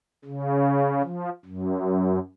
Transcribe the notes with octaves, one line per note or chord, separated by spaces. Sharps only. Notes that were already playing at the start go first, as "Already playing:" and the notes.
C#3
F3
F#2